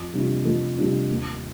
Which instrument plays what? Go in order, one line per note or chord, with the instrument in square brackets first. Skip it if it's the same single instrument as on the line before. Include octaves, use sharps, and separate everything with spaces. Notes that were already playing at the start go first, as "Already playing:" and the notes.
Already playing: [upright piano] F2
C3 G3 D4 F4
F2
C3 G3 D4 F4
D#2